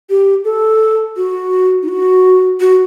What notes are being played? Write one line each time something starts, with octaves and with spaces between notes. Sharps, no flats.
G4
A4
F#4
D#4
F#4
F#4